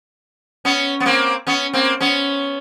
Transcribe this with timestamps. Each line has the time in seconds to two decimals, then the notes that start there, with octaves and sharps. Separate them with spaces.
0.65 B3 C#4
1.00 B3
1.06 A#3 C4
1.47 B3 C#4
1.73 A#3 C4
2.00 B3 C#4